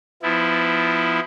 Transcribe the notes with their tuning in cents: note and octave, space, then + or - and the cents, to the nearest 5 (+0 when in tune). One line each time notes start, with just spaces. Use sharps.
F3 +0 B3 +20 E4 +0